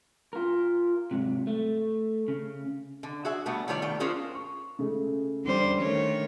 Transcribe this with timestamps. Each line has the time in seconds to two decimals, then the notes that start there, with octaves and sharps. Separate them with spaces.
0.33 F4 A#4
1.11 G#2 C3
1.47 A3
2.28 C#3
3.03 D3
3.25 F#4 G#4 E5
3.46 B2 G3 A3 B3
3.68 D#3 G3 A3 F4 C#5 D5
3.82 D#3 A3 G5
4.00 C#4 D4 F4 G#4 A#4 C5
4.34 C#6
4.79 C#3 G#3 A3
5.45 E2 D3 G3 C#4 C5
5.80 D#3 A3 C#5